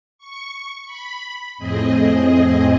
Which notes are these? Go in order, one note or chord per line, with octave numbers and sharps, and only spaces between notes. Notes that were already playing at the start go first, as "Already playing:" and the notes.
C#6
B5
F2 A2 C4 G#4 D#5